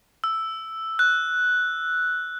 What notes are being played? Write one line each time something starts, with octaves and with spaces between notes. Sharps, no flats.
E6
F#6